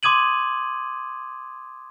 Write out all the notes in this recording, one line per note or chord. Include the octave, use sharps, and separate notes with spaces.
C6 D6 D#6 G#6 D#7 F#7